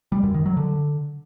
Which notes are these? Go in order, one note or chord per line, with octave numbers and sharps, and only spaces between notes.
G3
F#2
D#3
F#3
D3